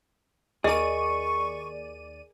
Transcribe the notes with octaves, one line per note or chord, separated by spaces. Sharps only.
D#2 G#4 A#4 D5 D#5 C#6 D#7